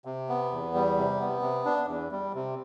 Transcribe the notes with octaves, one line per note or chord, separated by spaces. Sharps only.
C3
B3
E2
G3
C3
B3
C3
D4
E2
G3
C3